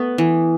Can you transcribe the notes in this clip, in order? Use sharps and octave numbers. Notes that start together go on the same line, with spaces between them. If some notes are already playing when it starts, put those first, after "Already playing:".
Already playing: A3 B3
E3